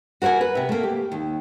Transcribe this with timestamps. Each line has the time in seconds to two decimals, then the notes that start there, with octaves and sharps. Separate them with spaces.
0.22 F#4 A#4 C5 F#5 G#5
0.41 B4
0.55 C3 E5
0.69 A3 A#3
0.83 G4
1.12 D#2